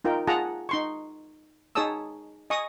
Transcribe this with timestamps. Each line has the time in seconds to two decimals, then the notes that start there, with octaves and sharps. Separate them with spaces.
0.04 D#4 F4 A#4 G5
0.27 F4 G#4 F#5 A5 A#5 D#6
0.69 D#4 C6 C#6
1.75 D#4 G#4 C#5 A5 D#6 E6
2.50 D#5 G#5 C#6 D#6